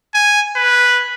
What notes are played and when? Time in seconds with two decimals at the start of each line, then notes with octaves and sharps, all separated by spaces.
0.14 G#5
0.56 B4